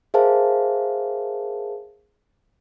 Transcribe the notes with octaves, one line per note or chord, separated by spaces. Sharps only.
G#4 A#4 C5 E5 F5 A5